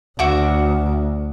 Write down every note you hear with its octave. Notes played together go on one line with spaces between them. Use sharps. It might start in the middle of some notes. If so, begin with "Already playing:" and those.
D2 F#4 E5 D6